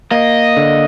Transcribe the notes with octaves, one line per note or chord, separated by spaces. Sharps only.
A#3 D#5
D3